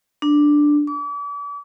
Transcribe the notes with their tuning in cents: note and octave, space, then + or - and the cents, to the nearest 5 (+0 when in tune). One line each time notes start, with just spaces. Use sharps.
D4 +5
D6 -40